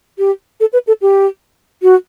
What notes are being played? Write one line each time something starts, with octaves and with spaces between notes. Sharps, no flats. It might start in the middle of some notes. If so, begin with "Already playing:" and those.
G4
A4
B4
A4
G4
F#4